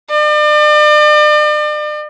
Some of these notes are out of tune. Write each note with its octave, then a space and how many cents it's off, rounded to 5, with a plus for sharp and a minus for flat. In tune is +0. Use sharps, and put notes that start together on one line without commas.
D5 +40